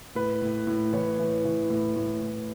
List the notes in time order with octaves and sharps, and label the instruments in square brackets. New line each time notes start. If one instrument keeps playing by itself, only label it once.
[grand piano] A2 B4
A2
A2
E3 C#5
E3
E3
A2
A2
A2